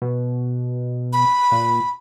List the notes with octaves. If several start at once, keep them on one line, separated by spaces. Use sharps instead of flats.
B2
B5
A#2